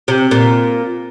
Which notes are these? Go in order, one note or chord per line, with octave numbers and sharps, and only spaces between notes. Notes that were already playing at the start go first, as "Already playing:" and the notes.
C3
A#2